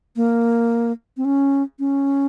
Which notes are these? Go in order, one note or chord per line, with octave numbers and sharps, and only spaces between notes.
A#3
C4
C#4
C#4